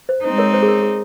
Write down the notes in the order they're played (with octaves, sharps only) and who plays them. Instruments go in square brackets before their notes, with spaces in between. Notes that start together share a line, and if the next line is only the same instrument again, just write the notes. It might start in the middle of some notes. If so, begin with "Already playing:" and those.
[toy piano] C5
[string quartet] G#3 C4 D#4 [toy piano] C5
[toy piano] A#4 C#5
C5
G#4
A#4
G#4